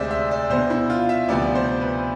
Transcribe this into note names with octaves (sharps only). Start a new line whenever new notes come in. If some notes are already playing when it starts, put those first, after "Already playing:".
Already playing: D2 C3 G#3 C5 D5 E5
E5
D5
B2 B3 D4 C5
E4
F4
E5
D2 C3 F3 B3 D5
C5
B4